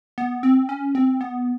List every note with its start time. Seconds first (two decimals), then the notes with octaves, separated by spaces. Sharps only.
0.18 B3
0.43 C4
0.69 C#4
0.95 C4
1.21 B3